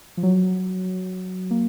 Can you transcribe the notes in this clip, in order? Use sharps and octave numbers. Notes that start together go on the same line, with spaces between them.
F3
F#3
A#3